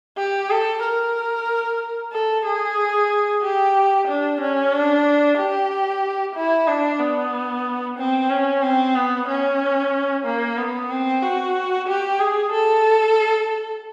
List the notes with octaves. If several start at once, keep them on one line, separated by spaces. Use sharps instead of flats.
G4
A4
A#4
A4
G#4
G4
D4
C#4
D4
G4
E4
D4
B3
C4
C#4
C4
B3
C#4
A#3
B3
C4
F#4
G4
G#4
A4